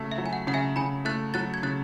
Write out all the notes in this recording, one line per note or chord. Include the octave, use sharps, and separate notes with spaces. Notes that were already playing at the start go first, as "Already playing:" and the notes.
Already playing: C#3 F#3 A3
E5
F#3
G#5
F#5
C#3 F#5
E5 G#5
C#3 G#5 B5
A3 F#6 A6
F#3 F#6 A6
G#6
C#3 F#6 A6